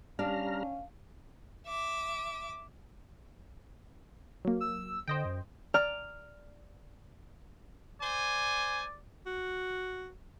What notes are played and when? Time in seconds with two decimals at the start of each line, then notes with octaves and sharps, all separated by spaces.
0.19 G3 C#4 D4 F5 A#5 F6
1.67 E5 D6
4.45 F#3 A#3
4.60 E6
5.08 D3 C5 D#5 G5
5.25 F#2
5.74 D5 G5 A#5 F6
8.01 C5 D5 G#5
9.26 F#4